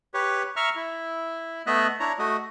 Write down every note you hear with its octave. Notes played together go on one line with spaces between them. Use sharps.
G4 B4 C#5
E5 A#5 C#6 F6
E4
A3 B3 D#5 E5 F#6
D4 E4 C#5 A#5
A3 F#4 D#5